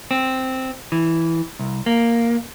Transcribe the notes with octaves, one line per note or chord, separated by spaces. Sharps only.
C4
E3
C2
A#3